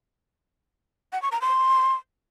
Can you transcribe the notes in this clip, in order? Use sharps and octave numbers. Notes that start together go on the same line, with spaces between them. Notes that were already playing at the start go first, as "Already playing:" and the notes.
F#5
C#6
A#5
C6